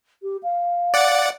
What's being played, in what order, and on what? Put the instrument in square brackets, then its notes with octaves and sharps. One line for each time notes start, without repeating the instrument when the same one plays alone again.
[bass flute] G4
F5
[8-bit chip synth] D5 F#5